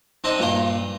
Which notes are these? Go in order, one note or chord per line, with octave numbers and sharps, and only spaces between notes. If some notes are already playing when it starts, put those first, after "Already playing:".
C4 D4 D#4 D#5
G2 A#2 A#5 C6